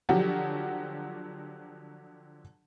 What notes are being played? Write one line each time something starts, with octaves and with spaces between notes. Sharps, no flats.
D3 F3 F#3 F#4 G4